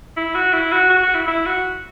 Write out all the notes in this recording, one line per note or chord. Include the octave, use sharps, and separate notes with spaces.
E4
F#4
E4
F#4
F#4
F#4
E4
E4
F#4